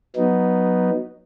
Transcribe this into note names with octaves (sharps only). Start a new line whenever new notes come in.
F#3 B3 D#4